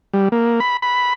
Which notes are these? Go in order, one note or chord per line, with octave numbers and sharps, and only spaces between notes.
G3
A#3
B5
B5